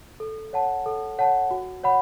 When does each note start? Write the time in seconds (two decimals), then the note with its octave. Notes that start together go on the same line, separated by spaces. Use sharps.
0.20 A4
0.53 C#5 F#5 A5
0.86 A4
1.18 C#5 F#5 A5
1.51 F#4
1.83 C#5 F#5 B5